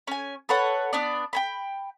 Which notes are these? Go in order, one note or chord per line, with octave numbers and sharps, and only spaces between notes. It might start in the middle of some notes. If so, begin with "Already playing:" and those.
C#4 G#5
A4 B4 C#5 F#5
B3 D4 D5
G5 G#5 B5